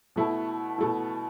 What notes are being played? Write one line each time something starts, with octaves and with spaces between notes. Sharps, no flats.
B2 A3 E4
B2 A3 E4